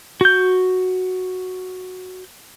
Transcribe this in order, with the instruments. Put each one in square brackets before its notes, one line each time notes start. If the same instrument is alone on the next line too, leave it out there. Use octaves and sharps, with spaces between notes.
[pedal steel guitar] F#4 G6